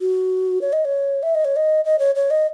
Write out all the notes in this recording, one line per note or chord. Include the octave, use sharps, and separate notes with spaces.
F#4
C#5
D#5
C#5
E5
D#5
C#5
D#5
D#5
C#5
C#5
D#5